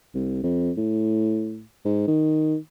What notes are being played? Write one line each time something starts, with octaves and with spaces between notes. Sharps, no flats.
C2
F2
A2
G#2
D#3